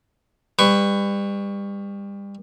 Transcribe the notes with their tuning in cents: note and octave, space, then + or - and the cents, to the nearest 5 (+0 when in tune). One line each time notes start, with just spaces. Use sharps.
G3 +30 B4 +20 C#6 +0